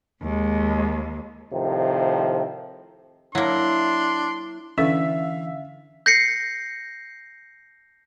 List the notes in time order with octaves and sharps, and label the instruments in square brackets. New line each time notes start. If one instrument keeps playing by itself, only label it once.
[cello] D#2 [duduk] G#3
[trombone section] A2 C3 D#3 F3
[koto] F#3 A#3 [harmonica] D4 [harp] E4 [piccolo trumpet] C6
[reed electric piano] D3 E3 [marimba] C#4 A4 [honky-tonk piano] E5 [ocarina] F5
[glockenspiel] G6 A#6 C7 C#7